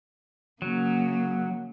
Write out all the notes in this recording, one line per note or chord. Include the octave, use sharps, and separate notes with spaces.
C#3 F#3 A#3